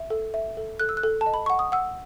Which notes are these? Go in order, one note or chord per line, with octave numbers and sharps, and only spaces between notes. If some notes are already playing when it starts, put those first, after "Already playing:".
Already playing: E5
A4
E5
A4
A4 F#6
E6
F#6
A4
A5
D#5
B5
F#5 C#6
D#6
F#5 E6